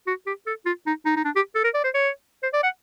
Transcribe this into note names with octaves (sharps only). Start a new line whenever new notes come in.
F#4
G4
A4
F4
D#4
D#4
D#4
D4
G4
A4
A#4
D5
C5
C#5
C5
D5
F#5